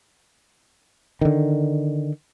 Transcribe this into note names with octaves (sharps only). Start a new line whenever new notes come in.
D3 D#3